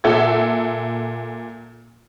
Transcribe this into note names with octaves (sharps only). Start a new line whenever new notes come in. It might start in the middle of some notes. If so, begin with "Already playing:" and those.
A#2 A4 E5 F#5 G#6